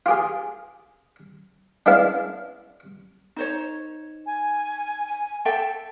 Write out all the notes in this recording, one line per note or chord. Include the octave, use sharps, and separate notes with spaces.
F4 G4 G#4
G#3 B3 C#4 D4 E4 F5
D#4 C5 C#5
G#5
A4 E5 G5